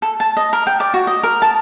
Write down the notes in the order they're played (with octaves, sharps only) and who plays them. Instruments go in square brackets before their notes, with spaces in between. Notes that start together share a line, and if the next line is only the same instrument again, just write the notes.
[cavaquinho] A4
A5
D#5
A#4
G5
D5
F#4
D#5
A#4
A5